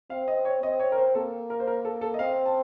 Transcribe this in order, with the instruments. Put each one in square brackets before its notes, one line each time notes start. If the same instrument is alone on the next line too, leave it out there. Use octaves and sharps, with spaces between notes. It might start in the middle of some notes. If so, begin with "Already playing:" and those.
[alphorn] C4 [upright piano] F5
[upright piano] D#5
C#5
[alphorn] C4 [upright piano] D#5
[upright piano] C#5
A#4
C5
[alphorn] A#3 [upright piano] A4
[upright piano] A#4
C5
A#4
A4
A4
D#5
[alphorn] C4 [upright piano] F5
[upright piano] A5